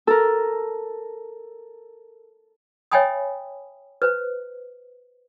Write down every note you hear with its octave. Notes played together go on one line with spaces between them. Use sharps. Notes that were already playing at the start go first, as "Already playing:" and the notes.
A4 A#4
C#5 E5 G5 G#5 B5 D#6
B4 C5